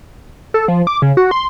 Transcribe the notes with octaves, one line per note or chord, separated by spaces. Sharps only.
A4
F3
D6
C#3
F#4
C6